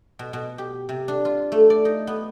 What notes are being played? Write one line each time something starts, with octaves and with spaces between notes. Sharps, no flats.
B2
B2
G4
C3
D4
F4
A3
D5
D#4
B3